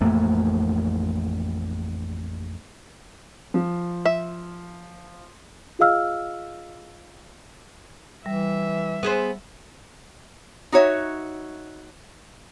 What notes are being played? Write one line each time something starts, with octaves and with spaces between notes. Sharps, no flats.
A1 F2 A3 A#3
F3
E5
F4 G#4 D#5 F5 E6 F6
E3 G3 E5
B3 G#4 C5
D#4 F#4 C#5 E5